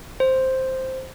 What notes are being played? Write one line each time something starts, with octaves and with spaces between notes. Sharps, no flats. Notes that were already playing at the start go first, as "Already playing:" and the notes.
C5